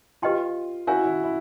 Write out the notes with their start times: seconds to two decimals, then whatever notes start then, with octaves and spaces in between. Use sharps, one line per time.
0.22 F4 G4 B4 D#5 G5 C6
0.87 E4 F#4 A#4 C#5 F5 G#5
1.04 E4
1.24 E4